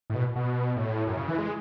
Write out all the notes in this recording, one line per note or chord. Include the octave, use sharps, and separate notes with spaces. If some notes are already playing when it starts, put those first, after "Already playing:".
A2
B2
B2
A2
F#2
C#3
E3
G#3